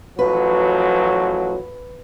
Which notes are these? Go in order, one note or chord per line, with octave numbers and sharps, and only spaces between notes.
A1 F3 F#3 B4